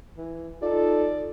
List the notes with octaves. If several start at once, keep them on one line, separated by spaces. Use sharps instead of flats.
E3
D#4 F4 A4 D5